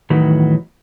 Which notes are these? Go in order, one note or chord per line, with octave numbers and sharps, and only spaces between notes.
E2 A2 D#3 F#3 B4